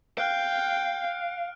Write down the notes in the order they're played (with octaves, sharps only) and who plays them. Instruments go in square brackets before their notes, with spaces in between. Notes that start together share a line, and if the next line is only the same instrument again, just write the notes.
[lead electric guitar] F5 [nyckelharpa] G5 [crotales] F6 F#6 D7